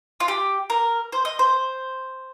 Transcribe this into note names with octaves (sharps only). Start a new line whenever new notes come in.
F4
G4
A#4
C5
D#5
C5